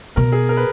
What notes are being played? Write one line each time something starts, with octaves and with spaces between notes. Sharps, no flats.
B2 A#4
G#4
A#4
B4